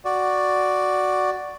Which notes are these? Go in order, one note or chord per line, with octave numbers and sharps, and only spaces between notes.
F#4 D5